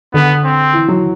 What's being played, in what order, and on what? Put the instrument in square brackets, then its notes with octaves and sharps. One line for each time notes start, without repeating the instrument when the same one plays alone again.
[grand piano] D3 [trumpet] B3
[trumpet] C4
[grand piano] E3
F#3